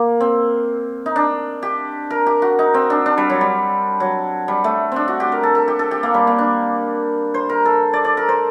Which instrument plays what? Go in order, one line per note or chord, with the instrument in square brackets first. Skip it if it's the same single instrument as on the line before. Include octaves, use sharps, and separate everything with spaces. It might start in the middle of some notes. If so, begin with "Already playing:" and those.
Already playing: [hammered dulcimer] A#3
C4
D#4
D4
G4
A#4
G4
F#4
D#4
C4
D4
D4
G3
F#3
G3
F#3
G3
A3
C4 D4
F#4
G4
A#4
A4
A4
G4
A4
G4
A#3
G3
A#3
D4
C5
A#4
A4
D5
D5
A#4
C5